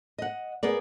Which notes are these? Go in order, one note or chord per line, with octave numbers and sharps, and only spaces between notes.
D#5 F#5
B3 G#4 A#4 D5